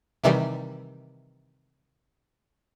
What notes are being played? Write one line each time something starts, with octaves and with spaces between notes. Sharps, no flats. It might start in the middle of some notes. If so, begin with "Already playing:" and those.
C3 D#3 E3 G3